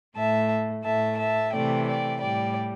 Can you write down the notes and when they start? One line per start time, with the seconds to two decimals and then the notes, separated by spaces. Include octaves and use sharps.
0.16 A2 A3 E5 A5
0.84 A2 A3 E5 A5
1.18 E5 A5
1.53 C3 E3 A3 D5 G5
1.87 D5 G5
2.21 A2 G3 D5 G5